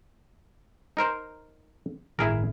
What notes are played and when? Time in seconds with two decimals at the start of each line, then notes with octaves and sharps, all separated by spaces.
0.97 D#4 A#4 C5
2.19 G1 A2 D#3 E4 G#4 A#4